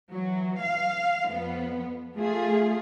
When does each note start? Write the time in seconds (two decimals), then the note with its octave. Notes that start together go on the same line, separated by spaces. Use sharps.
0.11 E3 F#3
0.62 F5
1.31 F2 B3
2.15 A3 F4 G#4